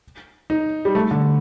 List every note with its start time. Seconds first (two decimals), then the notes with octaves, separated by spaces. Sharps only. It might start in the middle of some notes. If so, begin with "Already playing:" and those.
0.50 D#4
0.85 G3
0.95 A3
1.11 D3